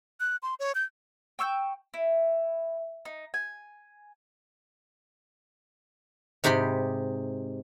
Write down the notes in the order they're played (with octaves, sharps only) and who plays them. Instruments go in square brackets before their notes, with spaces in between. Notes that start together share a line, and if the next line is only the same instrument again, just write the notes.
[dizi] F#6
C6
C#5
G6
[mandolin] G5 C#6 E6 G6
E4
D#4
G#5
[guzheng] G#2 C3 D#4 G4 B5 C6